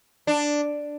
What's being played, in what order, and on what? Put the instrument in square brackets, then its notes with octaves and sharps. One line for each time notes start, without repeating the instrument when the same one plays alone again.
[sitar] D4